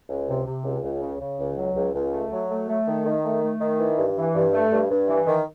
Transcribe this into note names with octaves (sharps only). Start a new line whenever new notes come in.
C#2
C3
C3
C#2
C#2
C#3
C#3
C#2
F#3
C#2
C#2
A3
F#3
A3
A3
D#3
D#3
A3
A3
D#3
E3
G2
E3
G2
A3
G2
G2
E3
D#3